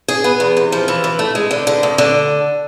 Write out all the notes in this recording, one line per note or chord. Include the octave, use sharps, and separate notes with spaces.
G#4
B3
E2
C3
F3
E3
E3
A3
G#3
D3
D3
D2
D3